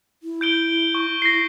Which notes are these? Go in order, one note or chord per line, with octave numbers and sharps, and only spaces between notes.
E4
G6 D7 G7
C#6
E4 A#6 C7